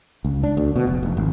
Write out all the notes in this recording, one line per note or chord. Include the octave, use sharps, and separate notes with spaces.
C#2
D4
D2
B2
F1
F1
G#1